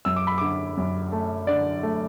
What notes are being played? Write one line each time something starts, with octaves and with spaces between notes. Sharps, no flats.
F#2 E6
D6
B5
D3 D6
F#2
A3
D3 D5
A3